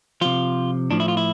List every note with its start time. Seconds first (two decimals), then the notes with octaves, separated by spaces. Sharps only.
0.21 C3 F3 F4
0.91 A2 F3 D4
1.00 E4
1.08 F4
1.17 E4